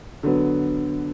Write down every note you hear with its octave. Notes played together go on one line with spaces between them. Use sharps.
D3 F#3 B3